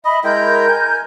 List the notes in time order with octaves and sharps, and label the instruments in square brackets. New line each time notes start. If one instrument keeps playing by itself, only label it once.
[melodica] D#5 [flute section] E5 B5
[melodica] G#3 E4 G5 [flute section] A#4 G6
[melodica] G#5